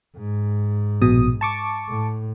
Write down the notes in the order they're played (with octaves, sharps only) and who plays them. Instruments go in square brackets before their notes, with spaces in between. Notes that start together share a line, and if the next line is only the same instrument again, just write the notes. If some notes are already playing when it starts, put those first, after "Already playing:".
[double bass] G#2
[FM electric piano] A#1 B2 D#6
A5 C#6 D6
[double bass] A2